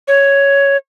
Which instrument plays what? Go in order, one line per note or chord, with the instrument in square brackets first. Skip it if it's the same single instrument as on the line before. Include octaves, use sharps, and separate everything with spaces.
[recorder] C#5